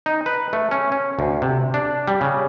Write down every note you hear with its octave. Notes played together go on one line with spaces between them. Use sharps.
D#4
B4
A3
C#4
C#4
D2
C3
D4
G3
C#3